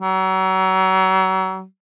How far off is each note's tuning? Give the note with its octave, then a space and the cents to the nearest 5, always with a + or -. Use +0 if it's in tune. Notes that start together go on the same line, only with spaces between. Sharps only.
F#3 +35